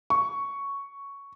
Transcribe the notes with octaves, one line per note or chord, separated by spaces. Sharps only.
C#6